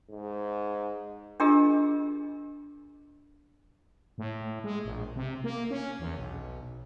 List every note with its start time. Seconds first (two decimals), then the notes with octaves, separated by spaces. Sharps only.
0.10 G#2
1.40 D4 F4 G4 G#4 A#4 D#5
4.18 A2
4.64 G#3
4.84 A#1
5.16 C3
5.44 A#3
5.71 C#4
6.00 E2
6.16 B1